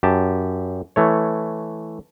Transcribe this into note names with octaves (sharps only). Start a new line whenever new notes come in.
F#2 G4 A5
E3 A3 C#5